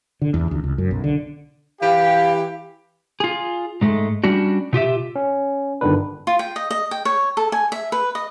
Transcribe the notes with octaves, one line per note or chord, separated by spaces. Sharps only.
D3
E2
D2
C#2
F#2
B1
D3
E3 G4 F5
F4 G#4
G#2 G#3 A3
G3 C#4 D4 F#4
B2 F4 G4 E5
C#4
G1 D3 D#3 D4 B4
F4
G5
D#5
D#5
G5
C#5
A4
G#5
E5
B4
D#5